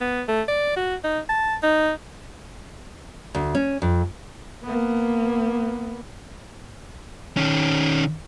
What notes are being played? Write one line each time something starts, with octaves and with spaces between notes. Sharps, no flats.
B3
A3
D5
F#4
D#4
A5
D#4
D2
C#4
F2
A#3 B3
D#3 C#4